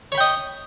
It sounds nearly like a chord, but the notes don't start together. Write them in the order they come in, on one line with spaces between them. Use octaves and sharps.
C#5 B5 G5 D#5